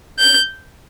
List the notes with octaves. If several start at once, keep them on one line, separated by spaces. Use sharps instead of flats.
G6